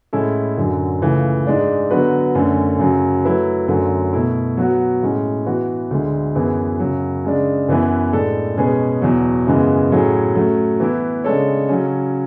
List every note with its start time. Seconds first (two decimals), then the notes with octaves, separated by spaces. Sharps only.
0.13 A2 G#3 C#4 E4 A4
0.57 F#2 D3 F#3
1.02 C#2 C#3 E3 A3
1.47 G#2 G#3 D4
1.91 D3 F#3 B3 F#4 B4
2.35 F#2 D3 A3 C#4
2.79 F#2 C#3 F#3
3.24 F#3 A3 E4 B4
3.68 F#2 D3 F#3 A3
4.13 B2 A3 E4
4.57 F#3 B3 F#4
5.02 A2 G#3 C#4
5.46 E3 B3 F#4
5.91 D2 D3 G#3
6.35 F#2 E3 B3 E4 G#4
6.80 F#2 C#3 F#3
7.25 C#3 G#3 D4
7.69 F#2 E3 B3 E4 B4
8.13 A2 G#3 D4 A4
8.57 B2 G#3 C#4 G#4 B4
9.02 E2 B2 F#3
9.47 F#2 C#3 E3 G#3 B3
9.91 A2 F#3 A3 C#4 G#4
10.36 F#3 A3 C#4
10.80 E3 B3 E4
11.24 C#3 G#3 D4 A4 C#5
11.69 C#3 F#3 C#4